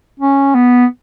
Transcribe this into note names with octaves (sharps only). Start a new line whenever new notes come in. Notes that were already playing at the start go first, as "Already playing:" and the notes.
C#4
B3